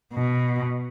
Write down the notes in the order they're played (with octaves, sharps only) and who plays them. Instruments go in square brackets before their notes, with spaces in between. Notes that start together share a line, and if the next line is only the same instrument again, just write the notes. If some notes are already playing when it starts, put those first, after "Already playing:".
[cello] B2